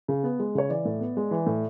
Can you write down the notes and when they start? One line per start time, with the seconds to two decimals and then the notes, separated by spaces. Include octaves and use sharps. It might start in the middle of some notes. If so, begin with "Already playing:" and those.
0.08 C#3
0.23 B3
0.39 G#3
0.55 C#3 C#5
0.69 E3 D5
0.85 A2
1.00 B3
1.17 G#3
1.31 E3
1.47 A2